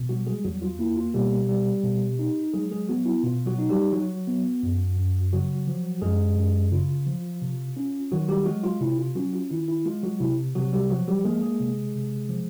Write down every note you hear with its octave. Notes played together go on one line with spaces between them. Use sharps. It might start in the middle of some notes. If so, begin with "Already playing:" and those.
Already playing: B2
F#3 G3 F#4
G#3 G#4
E2 F#3 F#4
F4
A#3 E4
F4
B2 G3 G4
G3
B2
D#4
F#3 G#3 G#4
G#3 G#4
F#3 B3 F#4
E4
B2 F4
F#3 F#4
D#4
G3 G4
F#3 F#4
B3
F#2
F#2
C#3 F#3 F#4
F3
F#2 G#3 G#4
F#2
C#3 F4
F3
C3
C#4
D#3 F#3 F#4
G3 G4
F#3 G#3 F#4
F4
C3 E4
F4
F#3 C#4 F#4
F4
D#3 E4
E4
G#3 F4
F#3 F#4
C3 E4
C3 F#3 F#4
G3 G4
F3 F#3 F#4
G3 G4
G#3 A#3 G#4
G#3 G#4
C3
C3
F3